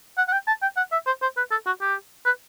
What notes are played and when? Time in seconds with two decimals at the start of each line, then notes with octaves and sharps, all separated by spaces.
0.17 F#5
0.28 F#5
0.32 G5
0.47 A5
0.62 G5
0.77 F#5
0.92 E5
1.07 C5
1.22 C5
1.37 B4
1.51 A4
1.66 F#4
1.81 G4
2.26 B4